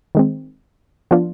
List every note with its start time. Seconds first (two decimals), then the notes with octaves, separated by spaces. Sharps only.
0.15 D#3 G#3 C4
1.11 F3 B3 D4 F4